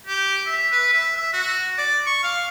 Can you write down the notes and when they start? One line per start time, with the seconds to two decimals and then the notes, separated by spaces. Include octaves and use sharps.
0.07 G4
0.46 E5
0.72 B4
0.93 E5
1.17 E5
1.33 F#4
1.78 D5
2.06 C#6
2.23 F5